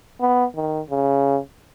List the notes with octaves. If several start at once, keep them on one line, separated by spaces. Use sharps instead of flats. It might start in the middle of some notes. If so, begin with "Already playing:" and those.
B3
D#3
C#3